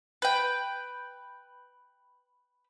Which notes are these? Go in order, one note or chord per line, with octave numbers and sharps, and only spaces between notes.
B4 G5